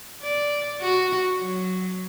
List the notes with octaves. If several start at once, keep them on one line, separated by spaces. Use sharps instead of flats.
D5
F#4
F#3